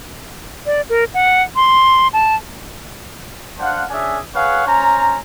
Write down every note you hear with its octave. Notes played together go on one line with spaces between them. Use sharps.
D5
A#4
F#5
C6
A5
D4 C5 F5 F#5
C#4 D4 G#4 E5 G#5
G#4 B4 C#5 F5 F#5
C#4 C5 A#5